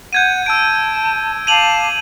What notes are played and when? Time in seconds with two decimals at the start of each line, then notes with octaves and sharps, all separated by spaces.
0.13 F#5 G6 G#6 D#7
0.46 A5 E6 D7
1.47 F5 A5 D6 D#7 F7 F#7